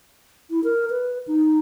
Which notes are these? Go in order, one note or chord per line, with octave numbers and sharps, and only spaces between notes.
E4
A#4
B4
D#4